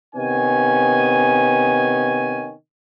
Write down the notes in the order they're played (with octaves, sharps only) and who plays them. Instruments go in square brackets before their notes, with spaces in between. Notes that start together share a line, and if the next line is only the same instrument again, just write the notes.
[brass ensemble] C3 D#3 B3 C#4 G#5